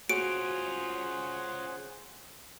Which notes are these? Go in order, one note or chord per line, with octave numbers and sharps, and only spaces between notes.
C#4 F4 F#4 G#4 C5 F#5 D7